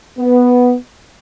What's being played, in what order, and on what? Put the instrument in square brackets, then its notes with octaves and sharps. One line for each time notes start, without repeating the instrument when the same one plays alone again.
[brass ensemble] B3